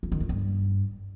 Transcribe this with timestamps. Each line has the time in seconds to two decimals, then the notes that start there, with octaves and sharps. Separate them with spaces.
0.03 E3
0.12 D#3
0.20 G#3
0.29 G2